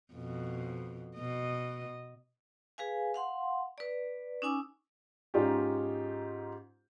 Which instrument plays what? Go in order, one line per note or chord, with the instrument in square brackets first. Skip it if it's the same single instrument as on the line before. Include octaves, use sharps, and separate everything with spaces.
[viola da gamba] F2 B2
B2 D#5
[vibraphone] G#4 B4 F5 G#5
F5 F#5 C6
B4 D5
C#4 D#4 G#5 D6 E6
[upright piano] G#2 C#4 D#4 F4 G4